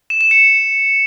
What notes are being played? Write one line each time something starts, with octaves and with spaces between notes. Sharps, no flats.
E7
E7
C#7